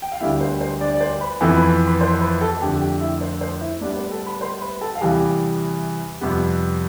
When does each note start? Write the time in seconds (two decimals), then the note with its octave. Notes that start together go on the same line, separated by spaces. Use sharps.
0.02 G5
0.12 F5
0.21 D2 D3 G3 B3 E4 E5
0.41 C5
0.61 C5
0.81 D4 D5
0.94 D5
1.01 C5
1.21 B4 B5
1.41 F2 E3 B3 A4 A5
1.56 B4 B5
1.86 B4 B5
2.01 C5 C6
2.21 B4 B5
2.41 A4 A5
2.61 F2 D3 A3 G4 G5
2.81 G4 G5
3.01 E4 E5
3.21 C5
3.41 C5
3.61 E4 E5
3.81 A2 G3 B3 D4 D5
3.96 C5
4.11 A4 A5
4.26 B4 B5
4.41 C5 C6
4.61 B4 B5
4.81 A4 A5
4.95 F5
5.01 E2 C3 E3 G3 G4 G5
6.21 F2 C3 G3 B3